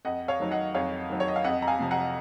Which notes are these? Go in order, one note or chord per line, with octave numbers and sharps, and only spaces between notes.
F2 D#5 F#5
C#5 F5
D#3 F#3
D#5 F#5
F2 C#5 F5
D#3 F#3
C#5
D#5
F5
F2 D#5 F#5
A#5
F5 G#5
C3 F3
F#5 A#5